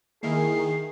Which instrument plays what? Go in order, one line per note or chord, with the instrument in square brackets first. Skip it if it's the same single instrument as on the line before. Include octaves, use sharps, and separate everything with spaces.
[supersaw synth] D#3 [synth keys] A#3 E4 A#4 [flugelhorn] G#4 [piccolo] C7